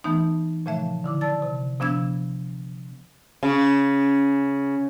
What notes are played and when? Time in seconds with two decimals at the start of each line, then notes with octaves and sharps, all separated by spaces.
0.04 E3 A3 B3 D#4
0.66 A#2 C#3 F3 A3 E5
1.04 D3 E4 D6
1.21 D5 A5 E6 A6
1.42 C3
1.80 C3 F3 B3 D4 E6 G#6
3.43 C#3